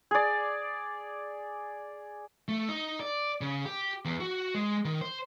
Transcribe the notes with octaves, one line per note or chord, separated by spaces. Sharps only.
G#4 D5
A3
D#4
D5
C#3
G4
E2
F#4
G#3
D#3
C5